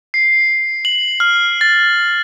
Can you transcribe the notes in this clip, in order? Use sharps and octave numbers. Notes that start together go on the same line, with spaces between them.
C7
F#7
F6
A6